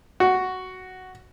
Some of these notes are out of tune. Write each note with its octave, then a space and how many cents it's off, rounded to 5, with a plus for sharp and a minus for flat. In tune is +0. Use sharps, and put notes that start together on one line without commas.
F#4 +5